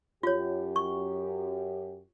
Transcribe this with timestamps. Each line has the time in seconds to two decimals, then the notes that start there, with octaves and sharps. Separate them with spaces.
0.23 F#2 F4 G4 C#5
0.76 C#6